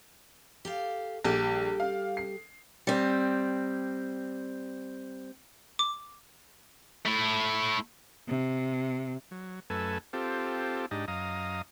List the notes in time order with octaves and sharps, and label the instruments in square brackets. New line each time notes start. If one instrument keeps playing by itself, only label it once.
[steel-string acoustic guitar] G4 A4 F5
[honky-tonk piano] A#1 [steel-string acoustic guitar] G3 G4 A4
[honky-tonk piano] F5
C7
[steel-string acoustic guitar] G3 C4
[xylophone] D6
[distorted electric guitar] A3 E4
[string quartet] C3
[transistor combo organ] F#3
F#2 A3 A4 B4 G#5 E6
C4 F4 G4 A4
G#2 D4 D#4 G4 D#5
F#2 D#5 F5 A#5 D#6